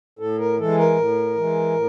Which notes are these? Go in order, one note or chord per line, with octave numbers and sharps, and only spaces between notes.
A2 A4
A#4
E3 G#3 A4
A#4
A2
E3 G#3
A2